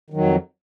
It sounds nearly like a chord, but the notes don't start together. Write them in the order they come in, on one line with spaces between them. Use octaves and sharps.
D#3 F#3 F2